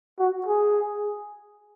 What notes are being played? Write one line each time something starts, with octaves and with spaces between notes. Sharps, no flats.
F#4
G#4